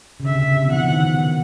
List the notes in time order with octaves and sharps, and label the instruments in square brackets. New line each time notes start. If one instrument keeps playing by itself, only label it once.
[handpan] C#3
[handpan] D3 [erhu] E5
[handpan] C3
C#3
B2
E3
[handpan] F3 [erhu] F#5
[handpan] D#3
B2